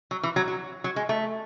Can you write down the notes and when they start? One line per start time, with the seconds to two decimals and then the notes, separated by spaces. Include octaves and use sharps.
0.11 F#3
0.23 E3
0.36 F#3
0.48 F#3
0.84 F#3
0.96 G#3
1.09 A3